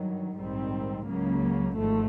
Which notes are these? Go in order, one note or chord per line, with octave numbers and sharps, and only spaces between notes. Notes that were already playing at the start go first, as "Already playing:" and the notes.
Already playing: G2 D#3 F#3
A#1 G#2 D#3 G3 C4
C#2 C#3 F#3 A#3
G#1 G#2 F3 A3